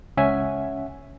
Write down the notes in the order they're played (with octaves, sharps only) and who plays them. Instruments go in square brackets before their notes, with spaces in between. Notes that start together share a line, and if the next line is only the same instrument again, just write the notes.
[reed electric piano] C#2 C#4 E5 F#5 G#5